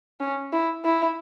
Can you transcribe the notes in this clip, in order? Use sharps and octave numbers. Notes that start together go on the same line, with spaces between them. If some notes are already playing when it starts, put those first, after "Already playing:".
C#4
E4
E4